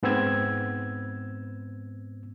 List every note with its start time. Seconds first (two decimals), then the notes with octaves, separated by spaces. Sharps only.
0.03 G#2 B3 C4 E6 G#6